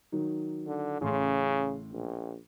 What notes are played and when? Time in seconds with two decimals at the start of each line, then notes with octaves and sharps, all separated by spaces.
0.12 D#3 F#3 D#4
0.67 D3
1.01 A1 A2 C#3 C6
1.92 A#1